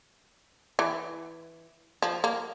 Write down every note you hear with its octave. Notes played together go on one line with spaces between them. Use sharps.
E3
F3
A#3